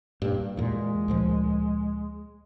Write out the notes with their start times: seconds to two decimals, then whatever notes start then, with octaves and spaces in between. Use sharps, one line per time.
0.22 G2 A#2
0.57 E2 A#2 G#3
1.08 D2 A#2 F3